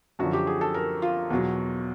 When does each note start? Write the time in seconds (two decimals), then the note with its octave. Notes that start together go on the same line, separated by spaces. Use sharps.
0.19 F#2 D3 F3 F#4
0.33 G4
0.47 G#4
0.61 A4
0.74 A#4
1.02 F4
1.30 E2 B2 F#3